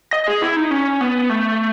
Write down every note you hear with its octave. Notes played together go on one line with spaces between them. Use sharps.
D#5
G#4
E4
D#4
C#4
B3
A3